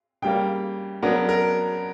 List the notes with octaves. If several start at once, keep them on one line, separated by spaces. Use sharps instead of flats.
C#3 G3 A#3 G5
C#3 F#3 B3 D4 A#4
A#4